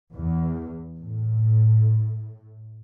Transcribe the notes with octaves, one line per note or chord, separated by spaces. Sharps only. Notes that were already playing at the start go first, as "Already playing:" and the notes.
E2
A2